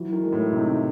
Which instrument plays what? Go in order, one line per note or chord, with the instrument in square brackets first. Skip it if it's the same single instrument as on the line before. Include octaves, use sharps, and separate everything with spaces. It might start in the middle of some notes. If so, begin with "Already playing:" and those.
Already playing: [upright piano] E3 F#3
[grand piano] D#3
[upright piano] G#3
[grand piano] A2
[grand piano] C3 [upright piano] D#4